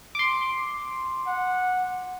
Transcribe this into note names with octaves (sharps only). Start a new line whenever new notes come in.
C6 D6
F#5